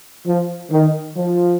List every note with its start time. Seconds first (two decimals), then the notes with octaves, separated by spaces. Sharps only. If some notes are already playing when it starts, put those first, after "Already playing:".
0.26 F3
0.71 D#3
1.16 F3